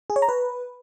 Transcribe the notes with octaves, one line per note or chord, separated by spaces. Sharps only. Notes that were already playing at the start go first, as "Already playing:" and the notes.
G#4
C#5
A#5
B4